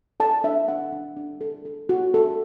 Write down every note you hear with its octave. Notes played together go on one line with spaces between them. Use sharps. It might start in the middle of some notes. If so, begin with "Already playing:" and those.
A4 A5
D4 E5
D4 F#5
D4
D4
A4
A4
F#4
A4